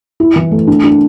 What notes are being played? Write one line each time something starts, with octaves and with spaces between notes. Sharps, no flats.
E4
E3
A3
D4
D4